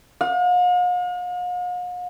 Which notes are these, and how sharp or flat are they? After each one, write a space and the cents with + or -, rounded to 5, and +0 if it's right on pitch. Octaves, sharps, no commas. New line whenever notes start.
F5 +45